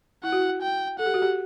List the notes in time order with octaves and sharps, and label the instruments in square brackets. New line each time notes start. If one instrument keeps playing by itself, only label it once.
[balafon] E4 [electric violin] F#5
[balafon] F#4
E4
[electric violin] G5
[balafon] A4 [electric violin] F#5
[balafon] G4
F#4
G4